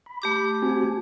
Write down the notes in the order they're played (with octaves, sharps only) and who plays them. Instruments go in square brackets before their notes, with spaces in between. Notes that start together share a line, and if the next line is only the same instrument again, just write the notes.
[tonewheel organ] B5
[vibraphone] A3 G4 D6
[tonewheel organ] C4 F#4 G#5